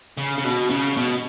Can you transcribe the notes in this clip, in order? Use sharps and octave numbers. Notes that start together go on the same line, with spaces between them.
C#3
C#3
B2
C#3
B2